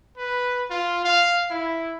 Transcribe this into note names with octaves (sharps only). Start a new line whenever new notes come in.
B4
F4
F5
E4